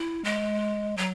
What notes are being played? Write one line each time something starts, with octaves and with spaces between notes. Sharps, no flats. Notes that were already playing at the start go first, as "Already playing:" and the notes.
Already playing: E4
G#3
F#3